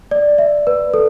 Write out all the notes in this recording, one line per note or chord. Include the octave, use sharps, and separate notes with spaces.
D5
E5
B4
A4